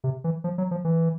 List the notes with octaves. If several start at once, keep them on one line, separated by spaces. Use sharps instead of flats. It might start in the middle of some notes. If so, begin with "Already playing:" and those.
C3
E3
F3
F#3
F3
E3